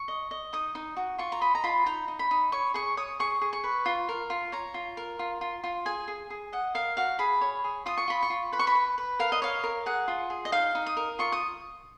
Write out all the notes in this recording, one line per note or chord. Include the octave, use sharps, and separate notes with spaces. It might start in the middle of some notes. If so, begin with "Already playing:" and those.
Already playing: C#6
D#5
D#5
D#4 D#6
D#4
F#4
F4 C#6
A#5
D#5 B5
A#5
F4 B5
D#4 A#5
D#4
B5
D#4
C#5 C#6
G#4 C#6
C#5 D#6
G#4 C#6
G#4
C#6
B4
F4
A#4
F4
C#5 A#5
F4
A#4
F4
F4
F4
G#4 G#5
G#4
G#4
D#5 F#5
A#4 F5
F#4 F5
G#4 B5
C#5
G#4
F4 D#6
C#6
F4 B5
C#6
F4
B4 B5
C#6
B5
B4
B4
A#4 F5
D#5
C#5 F5
A#4
G#4 F#5
F4
G#4
D#5
D#4 F5
D#4
D#6
A#4
F4 C#6
D#6